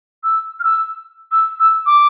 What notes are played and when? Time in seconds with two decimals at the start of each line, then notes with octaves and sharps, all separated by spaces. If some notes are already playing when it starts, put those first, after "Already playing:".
0.24 E6
0.60 F6
0.64 E6
1.32 E6
1.59 E6
1.86 D6